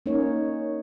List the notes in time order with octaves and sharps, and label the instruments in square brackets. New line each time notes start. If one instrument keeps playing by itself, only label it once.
[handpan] A#3 C#4 D#4 C#5